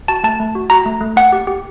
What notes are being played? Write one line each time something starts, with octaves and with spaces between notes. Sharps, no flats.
F#4 A5
A3 A5
A3
F#4
F#4 A#5
A3
A3
A#3 F#5
G4
G4